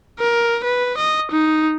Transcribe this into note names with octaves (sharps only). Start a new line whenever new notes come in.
A#4
B4
D#5
D#4